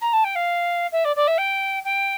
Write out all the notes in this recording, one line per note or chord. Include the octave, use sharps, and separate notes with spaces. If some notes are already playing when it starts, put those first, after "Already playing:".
A#5
A5
G5
F5
E5
D5
D5
E5
G5
G5